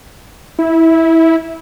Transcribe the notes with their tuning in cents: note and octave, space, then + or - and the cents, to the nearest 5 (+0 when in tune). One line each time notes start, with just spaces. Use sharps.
E4 -15